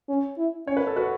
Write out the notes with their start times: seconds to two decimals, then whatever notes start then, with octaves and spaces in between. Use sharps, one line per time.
0.09 C#4
0.38 E4
0.67 C#4 C#5
0.77 B4
0.87 A4
0.96 F#4 B4